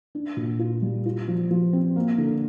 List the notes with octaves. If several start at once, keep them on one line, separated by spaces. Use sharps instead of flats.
D4
A#2
F4
G3
F4
F3
F3
C4
A#3
D3